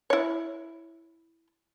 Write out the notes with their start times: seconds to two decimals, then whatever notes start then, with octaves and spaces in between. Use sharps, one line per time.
0.10 E4 C#5